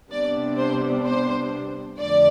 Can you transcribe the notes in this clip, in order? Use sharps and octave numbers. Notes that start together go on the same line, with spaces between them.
C3 G3 B3 D4 D5
C5
C5
F2 D3 F3 A3 D5